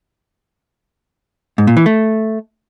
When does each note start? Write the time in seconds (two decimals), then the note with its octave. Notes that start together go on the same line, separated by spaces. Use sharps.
1.58 G#2
1.67 A#2
1.77 E3
1.86 A3